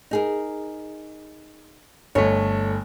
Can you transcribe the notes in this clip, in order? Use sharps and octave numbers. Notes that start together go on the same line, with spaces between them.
D#4 G#4 A#4
G1 A3 C#5 D#5